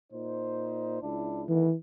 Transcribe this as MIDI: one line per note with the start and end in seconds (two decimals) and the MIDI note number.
0.13 1.01 46
0.13 1.01 63
0.13 1.01 72
1.02 1.44 37
1.02 1.44 62
1.02 1.44 64
1.49 1.69 51
1.49 1.75 52
1.49 1.69 57
1.49 1.69 59